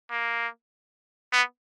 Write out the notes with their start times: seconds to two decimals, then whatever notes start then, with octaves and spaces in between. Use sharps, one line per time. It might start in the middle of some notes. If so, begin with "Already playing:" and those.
0.11 A#3
1.33 B3